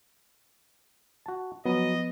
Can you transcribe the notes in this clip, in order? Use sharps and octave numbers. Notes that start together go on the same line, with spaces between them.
F#4 A5
F3 F#3 B3 D#5